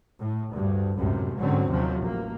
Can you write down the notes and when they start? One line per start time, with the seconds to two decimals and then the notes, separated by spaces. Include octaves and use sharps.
0.21 A2
0.51 D2 G2
0.98 C#2 F#2 A2 C3
1.39 G#2 D3 F#3 C4 C#4
1.68 D#2 C3 F3 F#3
2.03 A1 A#3